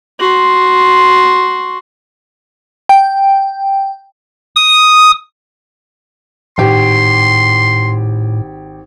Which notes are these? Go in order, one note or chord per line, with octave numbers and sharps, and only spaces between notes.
F#4 C6
G5
D#6
G#1 A2 G4 C6